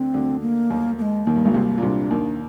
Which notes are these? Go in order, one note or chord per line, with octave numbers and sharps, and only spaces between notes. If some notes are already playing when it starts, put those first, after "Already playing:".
Already playing: D2 D3 C4
D2 D3
A#3
D#2 D#3
A#3
G#3
D#2 D#3 A#3
G2
G#1 G#2
C2 C3
A#2
C2 C3 D4
D#2 D#3